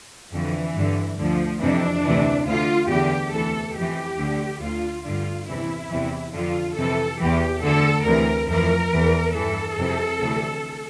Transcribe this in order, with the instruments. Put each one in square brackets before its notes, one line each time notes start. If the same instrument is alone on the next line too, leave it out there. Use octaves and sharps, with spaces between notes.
[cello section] F2 D3 E3
G2 D3
D2 D3 F3
F2 C3 E3 D4
D2 C3 E3
D2 D3 F4
E2 D3 G4
D2 C3 E3 A4
F2 E3 G4
D2 D3
D2 D3 F4
G2 D3 F4
E2 C3 E3 E4
E2 C3 E3
F2 D3 F4
F2 C3 E3 A4
E2 E3 G4
D2 D3 A4
D2 C3 E3 A#4
F2 E3 A#4
E2 E3
G2 E3 A4
F2 C3 E3
D2 C3 E3